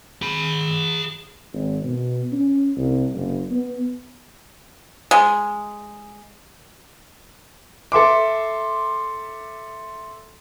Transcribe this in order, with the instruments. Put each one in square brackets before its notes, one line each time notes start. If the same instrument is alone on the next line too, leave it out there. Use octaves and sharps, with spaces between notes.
[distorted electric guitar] G#4 B5
[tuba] G#1
B2
C#4
C2
F#1
B3
[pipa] G#3
[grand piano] A4 E5 C6 D6